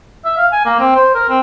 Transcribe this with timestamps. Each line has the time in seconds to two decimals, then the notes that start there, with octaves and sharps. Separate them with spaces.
0.25 E5
0.38 F5
0.52 G#5
0.65 A#3
0.79 C4
0.95 C5
1.15 A#4
1.29 C4